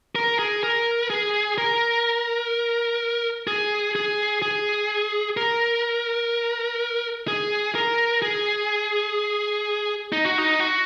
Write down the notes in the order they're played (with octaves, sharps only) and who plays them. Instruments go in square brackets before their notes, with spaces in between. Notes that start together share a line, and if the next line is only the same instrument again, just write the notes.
[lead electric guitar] A#4
G#4
A#4
G#4
A#4
G#4
G#4
G#4
A#4
G#4
A#4
G#4
D#4
F#4
D#4
F#4